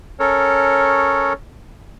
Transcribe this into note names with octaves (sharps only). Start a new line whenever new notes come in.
C#4 A4 A#4 C#5